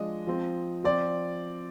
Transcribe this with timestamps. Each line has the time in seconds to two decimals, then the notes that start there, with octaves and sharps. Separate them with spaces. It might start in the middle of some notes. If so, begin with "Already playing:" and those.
Already playing: F3 G#3 D4 D#5
0.27 F3 C4
0.84 F3 C4 D5